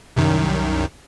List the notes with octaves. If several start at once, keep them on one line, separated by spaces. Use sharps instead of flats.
C2 F#2 D#3